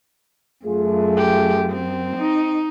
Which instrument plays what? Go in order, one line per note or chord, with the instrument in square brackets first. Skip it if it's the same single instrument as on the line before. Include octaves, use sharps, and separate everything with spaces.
[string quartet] F#2 [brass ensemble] A3 F4 G#4
[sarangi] G4
C4
[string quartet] D#4